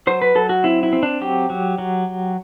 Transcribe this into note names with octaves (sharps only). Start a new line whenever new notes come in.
F#3 C5
B4
F#3 A4
F#4
C4 E4
E4
C4
D4
F#3 G4
F#3
F#3